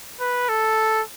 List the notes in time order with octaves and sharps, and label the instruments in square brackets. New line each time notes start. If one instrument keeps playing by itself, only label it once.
[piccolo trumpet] B4
A4